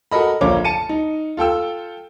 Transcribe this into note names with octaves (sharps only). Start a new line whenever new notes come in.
F#4 A4 A#4 D#5 B5
A#1 D3 A#3 C#5 D6
A5 C#7 D#7
D#4
F4 A4 G5 E6